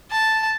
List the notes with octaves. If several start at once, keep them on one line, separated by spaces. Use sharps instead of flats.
A5